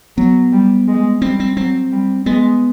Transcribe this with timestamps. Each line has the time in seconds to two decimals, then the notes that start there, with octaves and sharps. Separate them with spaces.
0.17 F#3 B3
0.52 G3
0.88 G#3
1.22 G3 C4
1.40 C4
1.57 F#3 C4
1.91 G3
2.26 G#3 B3